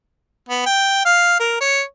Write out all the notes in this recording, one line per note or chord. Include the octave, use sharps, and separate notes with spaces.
B3
G5
F5
A#4
C#5